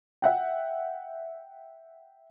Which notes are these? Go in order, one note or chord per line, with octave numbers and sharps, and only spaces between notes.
E5 F#5 G5